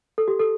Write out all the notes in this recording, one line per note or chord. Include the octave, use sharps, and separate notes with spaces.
A4
G4
A4